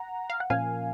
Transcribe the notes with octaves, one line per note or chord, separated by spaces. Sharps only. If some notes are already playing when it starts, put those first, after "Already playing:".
Already playing: F#5 A#5
F5
F#5
A#2 F3 A#3 C#4 F5 G#5